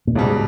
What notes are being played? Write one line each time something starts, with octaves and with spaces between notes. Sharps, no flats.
A#2
C#2 G#2 B2 G3